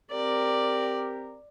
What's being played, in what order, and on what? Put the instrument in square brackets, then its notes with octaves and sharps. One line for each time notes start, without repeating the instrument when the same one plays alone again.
[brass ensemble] C4 G4 A#4 [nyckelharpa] D5